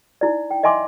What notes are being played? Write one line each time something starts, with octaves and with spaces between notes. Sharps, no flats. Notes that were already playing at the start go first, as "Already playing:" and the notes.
D#4 E4 D5
G5
D#5 E5 G#5 C6 D6